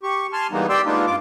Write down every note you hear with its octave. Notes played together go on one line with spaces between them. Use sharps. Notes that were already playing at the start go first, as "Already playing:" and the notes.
G4 C#6
G#5 A5 C6 F6
E3 G3 G#3 A#3 B3 D#4
G4 D5 G5 C6 E6
G#3 A#3 B3 D4 D#4 F4
G2 F4 D6